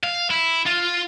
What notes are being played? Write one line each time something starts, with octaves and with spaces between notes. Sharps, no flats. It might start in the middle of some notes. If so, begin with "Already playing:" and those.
F5
E4
F4